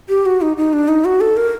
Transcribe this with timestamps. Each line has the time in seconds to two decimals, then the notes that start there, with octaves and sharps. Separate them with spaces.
0.09 G4
0.26 F#4
0.42 D#4
0.57 D#4
0.73 D4
0.88 D#4
1.05 F#4
1.21 A4
1.37 A#4